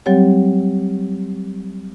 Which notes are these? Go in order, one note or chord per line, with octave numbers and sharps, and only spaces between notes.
F#3 G3 C4 G4 C#5